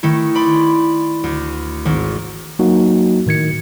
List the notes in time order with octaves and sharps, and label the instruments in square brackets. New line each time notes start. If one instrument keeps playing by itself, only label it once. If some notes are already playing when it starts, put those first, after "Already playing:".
[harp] D#3 A3 E4
D5 B5 C6
D2
G#1
[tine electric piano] F#3 A#3 D#4 F#4
A2 D#3 G#6 C#7